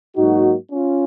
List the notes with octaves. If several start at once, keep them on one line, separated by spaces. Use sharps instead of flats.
G#2 F#3 A#3 D#4 F#4
C#4 F4